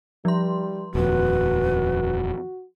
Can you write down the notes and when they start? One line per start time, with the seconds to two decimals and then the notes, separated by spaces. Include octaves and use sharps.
0.25 F3 G3 C6
0.95 D#1 F2 F#4 B4